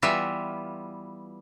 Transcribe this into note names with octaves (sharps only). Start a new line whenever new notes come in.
E3 G3 B3 F4 E5